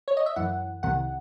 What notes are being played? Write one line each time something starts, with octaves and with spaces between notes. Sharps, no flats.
C#5
D#5
E5
F#2 E3 F#5
C2 C3 D#3 F#5